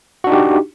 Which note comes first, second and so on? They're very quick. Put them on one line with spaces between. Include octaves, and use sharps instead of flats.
F#4 D4 D#4 G4